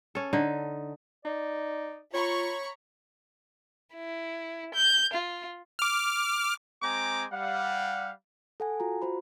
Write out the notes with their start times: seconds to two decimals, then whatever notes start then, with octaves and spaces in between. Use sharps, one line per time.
0.15 C#4 A4
0.33 D3 D#4
1.25 D#4 D5
2.14 F4 C#5 A#5 B5 C#6
3.95 E4
4.75 G6
5.13 F4
5.79 D6 F6
6.83 G#3 C4 G5 G#5 A#5 D6
7.32 G3 F5 F#5
8.60 A4 F#5 G#5
8.80 F4 F#4 A#5
9.02 F4 F#4 C5 B5